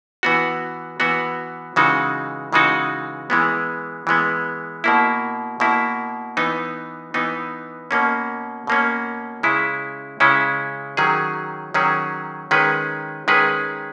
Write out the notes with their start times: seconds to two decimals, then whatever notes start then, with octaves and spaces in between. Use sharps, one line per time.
0.23 E3 B3 F#4
1.00 E3 B3 F#4
1.76 C#3 E3 G#3 D#4 F#4
2.53 C#3 E3 G#3 D#4 F#4
3.30 E3 G#3 B3
4.07 E3 G#3 B3
4.84 B2 A#3 E4
5.60 B2 A#3 E4
6.37 E3 B3 D#4
7.14 E3 B3 D#4
7.91 B2 A#3 C#4
8.67 B2 A#3 C#4
9.43 C#3 G#3 C#4 E4
10.20 C#3 G#3 C#4 E4
10.97 D#3 F#3 C#4 G#4
11.74 D#3 F#3 C#4 G#4
12.51 D#3 G#3 C#4 G#4 B4
13.28 D#3 G#3 C#4 G#4 B4